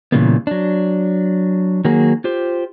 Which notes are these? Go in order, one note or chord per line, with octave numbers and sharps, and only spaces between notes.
A#2 C#3 E3 G3 A#3 B3
F#3 D4
D#3 F#3 A#3 F#4 G#4
F4 G4 C5